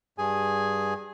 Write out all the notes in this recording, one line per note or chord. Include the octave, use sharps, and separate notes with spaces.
G2 G#4 G#5